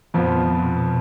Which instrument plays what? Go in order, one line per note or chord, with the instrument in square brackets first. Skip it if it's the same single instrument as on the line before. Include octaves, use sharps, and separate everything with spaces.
[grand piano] F2 F3 B3 [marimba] A#2
[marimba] B2
A#2
B2